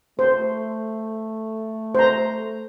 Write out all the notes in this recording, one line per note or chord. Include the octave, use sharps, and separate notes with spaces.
A3 C5
C5 A#5